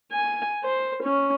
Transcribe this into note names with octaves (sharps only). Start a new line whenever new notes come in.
G#5
C5
C#4